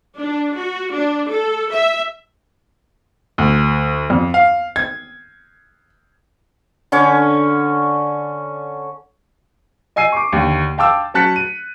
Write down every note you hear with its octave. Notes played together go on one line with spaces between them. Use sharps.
D4
F#4
D4
A4
E5
D2
F2
F5
G#6
D3 C#4 C#5 D6
D#5 G#5 E6 C7 D#7
C#6 D6
D#2 D3
F5 G5 A5 D6 E6
F#3 C#4 A5 F#6 B6 C#7
D#7